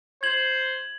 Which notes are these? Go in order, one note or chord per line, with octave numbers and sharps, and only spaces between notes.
C5 G#6 F#7